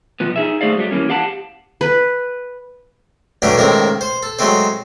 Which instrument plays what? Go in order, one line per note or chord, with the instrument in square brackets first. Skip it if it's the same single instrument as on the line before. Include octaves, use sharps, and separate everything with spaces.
[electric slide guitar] B2 F3 B3
D#4 G#4 E5
A3 G#4 C5 D5 F5
F#3 G3 A3 G4
E3 A#3 C#4
G4 F5 F#5 A5
[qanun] B4
[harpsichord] D3 E3 F#3 G3 A3 D4
C#2 A2 D#3 C4 A#4
C5
A4
F#3 G#3 A3 C4 C5